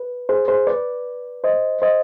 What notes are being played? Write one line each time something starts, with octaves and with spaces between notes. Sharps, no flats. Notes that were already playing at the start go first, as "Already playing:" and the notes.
Already playing: B4
G#4 C5
G#4 C5
B4 D5
C5 D#5
C5 D#5